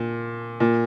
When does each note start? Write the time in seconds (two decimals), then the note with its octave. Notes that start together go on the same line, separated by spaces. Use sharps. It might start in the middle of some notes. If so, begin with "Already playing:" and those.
Already playing: A#2
0.60 A#2